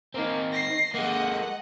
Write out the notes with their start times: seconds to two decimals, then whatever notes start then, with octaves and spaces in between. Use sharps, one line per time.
0.15 A#3 C4 D#4
0.53 A#6 C7
0.94 G#3 A#3 D#5 F#5